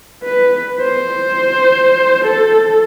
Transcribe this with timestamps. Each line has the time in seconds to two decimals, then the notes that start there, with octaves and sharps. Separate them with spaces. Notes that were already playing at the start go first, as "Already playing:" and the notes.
0.23 B4
0.81 C5
2.24 A4